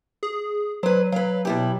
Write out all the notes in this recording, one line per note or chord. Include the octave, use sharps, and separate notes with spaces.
G#4
F#3 B4 C5
F#3 B4 F5
B2 E4 G4